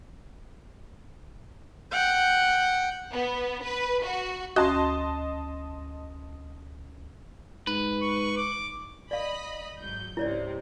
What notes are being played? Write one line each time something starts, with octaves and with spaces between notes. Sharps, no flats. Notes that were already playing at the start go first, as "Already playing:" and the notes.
F#5 G5
B3
B4
F#4
D2 C#4 F#4 D#5 A5 C6 G#6
G#2 B4
C#6
D6
D5 D#5 F5 B5
G#1 F#3 G6
C#2 G#2 C3 E4 C#5 D5